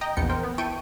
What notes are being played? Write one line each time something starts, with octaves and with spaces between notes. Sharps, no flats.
D#5 G5 A#5
A#1 E2 B3 G5 C#7
A#4 C5 G5
B3
E4 G5 A5 C#6 D7 D#7